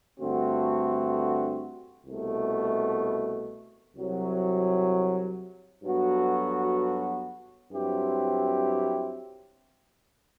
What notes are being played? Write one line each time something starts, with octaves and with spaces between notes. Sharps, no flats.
G2 D3 A3 C4 F#4
C2 B2 A3
C2 C3 F#3
G2 F#3 B3 F#4 A4
G2 F#3 C4 E4 G4